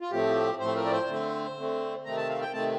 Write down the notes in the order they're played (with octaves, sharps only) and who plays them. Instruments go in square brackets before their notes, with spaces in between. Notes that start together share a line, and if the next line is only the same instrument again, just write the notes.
[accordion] F4
A2 F3 A3 C4 G4
A2 F3 A3 C4 C5
A#4
D5
C5
D3 A3 C4
D3 A3 C4
C3 D#3 A3 C4 A#5
A5
F5
G5
C3 D#3 A3 C4 A5